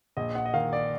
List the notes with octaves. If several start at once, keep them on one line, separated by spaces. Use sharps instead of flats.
A#1 D#5
F#5
D#5
D#3 F5
D5